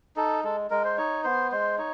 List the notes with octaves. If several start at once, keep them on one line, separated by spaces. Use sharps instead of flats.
D#4 A4
G#3 A4
G#3 A#4
C5
D#4 C#5
B3 C5
G#3 C5
D#4 C#5